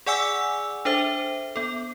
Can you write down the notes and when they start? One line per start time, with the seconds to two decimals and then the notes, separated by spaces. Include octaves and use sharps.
0.06 G#4 D5 F#5 G#5 D6 E6
0.85 D4 A4 C5 E5
1.56 B3 A4